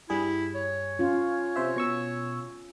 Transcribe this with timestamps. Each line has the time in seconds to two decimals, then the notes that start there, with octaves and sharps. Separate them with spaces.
0.10 G2 G3 E4 G#4
0.55 C#5
0.99 C#4 F4
1.56 C3 C5 E5
1.76 B2 C#6 E6